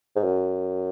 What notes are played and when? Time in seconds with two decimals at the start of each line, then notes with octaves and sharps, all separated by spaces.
0.16 G#2
0.24 F#2